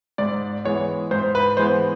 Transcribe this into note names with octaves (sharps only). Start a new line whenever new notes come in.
G#2 D5
E3 G#3 B3 C#5
G#2 C5
B4
E3 G#3 B3 C5